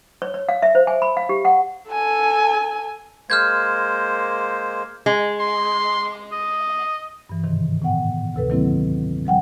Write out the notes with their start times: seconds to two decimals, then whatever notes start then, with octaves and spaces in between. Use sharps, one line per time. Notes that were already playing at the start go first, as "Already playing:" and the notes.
0.22 C#5
0.34 C#5
0.49 F5
0.62 E5
0.75 C5
0.87 G#5
1.02 B5
1.17 F5
1.29 G4
1.45 F#5
1.90 A4 G#5
3.30 G#3 A#3 C5 F6 G6 G#6
5.06 G#3
5.40 C6
6.32 D#5
7.29 G2 E3
7.44 G#2 C3 D#3
7.82 A2 B3 F#5 G5
8.34 D2 C3 A4 B4
8.50 D#3 F#3 A#3 C4 E4
9.25 F3 G3 F#5 G5